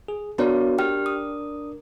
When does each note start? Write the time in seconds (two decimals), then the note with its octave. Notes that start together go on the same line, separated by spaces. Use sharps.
0.08 G#4
0.38 B3 D4 F#4 A#4 C#5 D5
0.78 G4 G5 F6
1.06 D#6